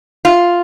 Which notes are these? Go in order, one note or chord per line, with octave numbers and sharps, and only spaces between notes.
F4